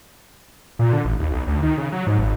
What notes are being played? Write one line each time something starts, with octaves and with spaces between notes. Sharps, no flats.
A#2
D3
A1
D#2
B1
D2
D#3
C#3
F#3
G#2
G#1